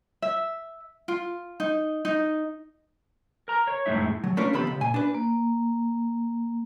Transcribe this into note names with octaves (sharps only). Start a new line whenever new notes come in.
E5
F4
D#4
D#4
A#4 A#5
C#5
F2 A2 C#3 G#3 D#4 E5
F#3
A3 C#4 D4 F4 A#4 B4
D#2 C3 F3 B3 A4 B5
C#2
A#2 G#5
D4 B4
A#3